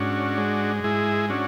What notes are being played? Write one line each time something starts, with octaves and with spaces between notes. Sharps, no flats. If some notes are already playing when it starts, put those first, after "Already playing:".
Already playing: G#2 C#4 D4 F#4
G#3
G#2 E4 G#4
C#4 D4 F#4